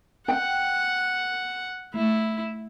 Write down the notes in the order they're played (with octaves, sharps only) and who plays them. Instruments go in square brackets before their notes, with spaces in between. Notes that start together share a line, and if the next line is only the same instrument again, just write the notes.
[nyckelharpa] F#5 [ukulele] G5
[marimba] A3 [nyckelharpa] E4